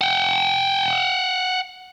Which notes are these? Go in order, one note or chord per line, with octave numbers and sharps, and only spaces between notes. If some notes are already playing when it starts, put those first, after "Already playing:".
F#5 G5